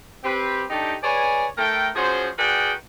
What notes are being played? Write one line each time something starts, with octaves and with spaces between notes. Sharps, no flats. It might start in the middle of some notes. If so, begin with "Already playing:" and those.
C4 G4 B4
A3 D4 D#4 G4
G#4 B4 C#5 D5 G#5
A3 A#4 G5
F3 C#4 F#4 G#4 C5
F#4 G#4 A#4 B4 D5 G5